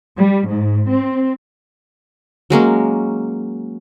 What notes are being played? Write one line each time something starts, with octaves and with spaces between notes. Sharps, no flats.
G3
G#2
C4
F#3 G#3 A#3 C#4